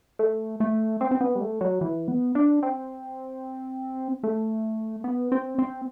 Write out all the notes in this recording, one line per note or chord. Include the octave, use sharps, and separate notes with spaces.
A3
A3
C4
C4
B3
G3
A3
F#3
E3
B3
D4
C4
A3
B3
C4
C4